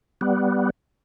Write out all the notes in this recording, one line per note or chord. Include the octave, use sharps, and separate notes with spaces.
G3 B3